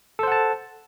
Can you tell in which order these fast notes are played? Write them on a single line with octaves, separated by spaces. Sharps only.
A4 C5 F#5 A5